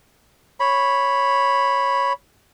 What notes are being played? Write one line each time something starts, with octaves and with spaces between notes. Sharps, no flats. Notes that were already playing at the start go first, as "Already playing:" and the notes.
C#5 B5